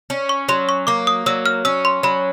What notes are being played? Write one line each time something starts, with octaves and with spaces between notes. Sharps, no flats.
C#4
C#6
F#3 C6
C#6
A#3 D6
D#6
F#3 E6
F6
C#4 E6
C6
F#3 B5